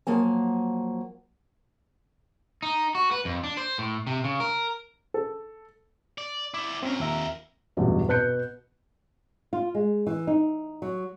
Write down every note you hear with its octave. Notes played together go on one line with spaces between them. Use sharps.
F3 F#3 A#3 G#5
D#4
F#4
B4
F2
D4
C5
A2
C3
C#3
A#4
A4
D5
E4 D5 D6
F2 C4 C#4 A#4
D#2 E5 A#5
A1 E2 G2 B2 F#3
B2 B4 F#6 G6 C#7
F4
G#3
E3
D#4
F#3